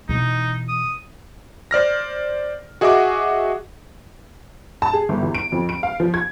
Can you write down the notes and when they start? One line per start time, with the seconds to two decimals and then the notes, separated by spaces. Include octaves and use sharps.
0.09 B2 E3 D#4
0.68 D#6
1.71 C5 D5 F6 A#6
2.81 F#4 G#4 D#5 E5 F#5 D6
4.82 A5
4.93 G#4
5.09 G1
5.23 E2
5.35 D7
5.52 F2
5.69 D7
5.83 F5
6.00 F3
6.14 G#6